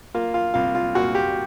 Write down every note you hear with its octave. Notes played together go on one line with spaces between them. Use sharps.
A#3 F4
F4
C2 F4
F4
A#2 F#4
G4